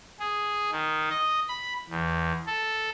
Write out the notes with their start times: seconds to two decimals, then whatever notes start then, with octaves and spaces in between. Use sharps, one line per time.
0.20 G#4
0.72 D#3
1.10 D#5
1.48 B5
1.89 E2
2.47 A4